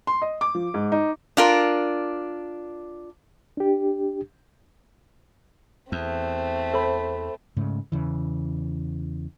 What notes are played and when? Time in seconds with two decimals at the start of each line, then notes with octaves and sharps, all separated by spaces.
0.07 C6
0.22 D#5
0.41 D6
0.55 F3
0.74 G#2
0.92 D#4
1.37 D4 F4 A#4
3.57 D4 G4
5.92 E2 A3 C4
6.74 A4 C5 B5
7.57 G#2 C#3 A3
7.92 E2 C#3 E3